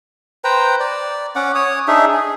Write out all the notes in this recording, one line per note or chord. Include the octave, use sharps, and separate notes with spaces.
B4 C5 G5 A#5
D5
C#4 F#5 D6
C#5 D#6
D4 D#4 G#4 E5
G#4